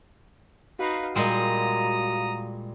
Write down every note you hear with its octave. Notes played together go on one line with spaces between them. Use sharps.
D#4 F#4 B4 F5
A#2 G3 G#3 A#5 D#6